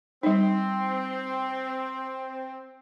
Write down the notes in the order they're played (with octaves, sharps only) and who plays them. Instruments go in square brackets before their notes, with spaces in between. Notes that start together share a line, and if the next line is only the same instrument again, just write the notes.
[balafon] G3 D#4 [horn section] C4